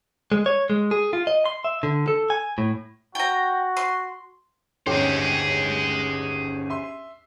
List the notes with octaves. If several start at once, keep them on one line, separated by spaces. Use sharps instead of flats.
G#3
C#5
G#3
G#4
F4
D#5
C6
E5
D3
A4
G#5
A2
F#4 G5 A#5
C6
G1 D#2 C#4 G4 G#4 C5
E5 C6